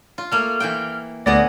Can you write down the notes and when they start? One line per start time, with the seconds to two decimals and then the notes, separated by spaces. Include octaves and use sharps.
0.18 F4
0.31 A3 A#3 F6
0.60 E3 A#3 G5
1.26 D2 A2 B3 G#4 D5 A#6